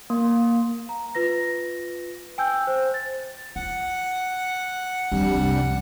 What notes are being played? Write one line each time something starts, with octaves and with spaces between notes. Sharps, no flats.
A#3
A#5
F4 B4 A#6
G5 G#5 E6 G6
C5
A6
F4 F#5
E2 D#3 F3 G3 C4 D4
C2 F#2